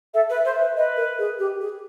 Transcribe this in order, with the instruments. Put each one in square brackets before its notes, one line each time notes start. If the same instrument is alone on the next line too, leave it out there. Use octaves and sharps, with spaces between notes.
[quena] A4 [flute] E5
[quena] B4
[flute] E5
[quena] C5
[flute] E5
[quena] B4
[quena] B4 [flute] D#5
[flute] A#4
G#4
G4
G#4